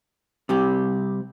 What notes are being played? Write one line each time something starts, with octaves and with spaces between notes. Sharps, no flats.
C3 G3 G4